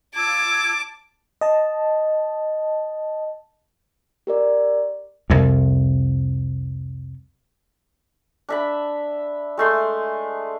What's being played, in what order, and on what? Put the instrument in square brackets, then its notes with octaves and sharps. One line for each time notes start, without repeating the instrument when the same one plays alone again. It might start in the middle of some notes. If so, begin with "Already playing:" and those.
[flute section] F4 E6 G#6 [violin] A5 D6
[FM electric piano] D#5 A5
[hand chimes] G4 A#4 D5
[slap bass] C2 F2
[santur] D4 E5 B5
G#3 A3 C6